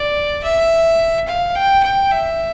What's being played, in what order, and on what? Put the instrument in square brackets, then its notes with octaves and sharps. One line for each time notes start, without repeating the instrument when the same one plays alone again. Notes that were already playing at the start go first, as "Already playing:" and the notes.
Already playing: [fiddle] D5
E5
F5
G5
G5
E5